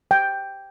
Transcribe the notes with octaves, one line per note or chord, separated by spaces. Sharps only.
G5